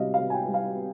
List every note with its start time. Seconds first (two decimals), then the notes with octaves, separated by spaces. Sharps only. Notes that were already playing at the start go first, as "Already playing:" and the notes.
Already playing: C3 G3 D#5 F5
0.14 F5
0.20 C3
0.30 G#5
0.34 G5
0.48 G3
0.54 F5